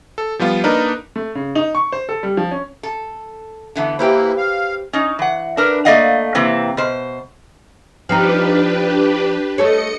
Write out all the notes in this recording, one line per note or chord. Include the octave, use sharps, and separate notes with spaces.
A4
F3 G3 B3 F4
A#3 D4 D#4 A#4 B4
A3
C#3
D#4
C#6
C5
A4
G3
F3
C#4
A4
D3 E3 B3
E3 A#3 E4 G4 B4 C5
F5
C#4 D#4
E3 F#5
D4 A#4 B4
A3 A#3 D5 D#5 F5 F#5
C3 E3 A#3 C4
B2 C5
F3 C4 D4 D#4 G4 B4
A3 A4 C#5 D#5 C#7